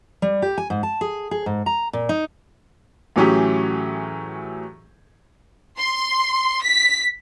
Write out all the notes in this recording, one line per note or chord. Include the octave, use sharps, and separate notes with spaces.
G3
G4
G#5
G#2
A5
G#4
G#4
G#2
A#5
A#2
D#4
A2 E3 F#3 C#4 G4 G#4
C6
B6